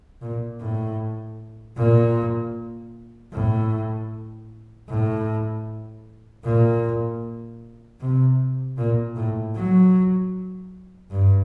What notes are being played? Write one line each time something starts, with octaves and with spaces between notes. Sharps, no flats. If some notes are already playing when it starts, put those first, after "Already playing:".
A#2
A2
A#2
A2
A2
A#2
C3
A#2
A2
F#3
G2